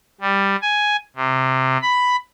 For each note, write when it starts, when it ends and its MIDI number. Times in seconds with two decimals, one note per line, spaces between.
0.21 0.56 55
0.62 0.96 80
1.16 1.78 48
1.82 2.16 83